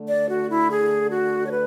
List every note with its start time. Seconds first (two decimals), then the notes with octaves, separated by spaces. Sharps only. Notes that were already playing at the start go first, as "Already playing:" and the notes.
Already playing: D3 A3
0.08 D5
0.29 F#4
0.49 E4
0.69 G#4
1.09 F#4
1.45 C#5
1.50 B4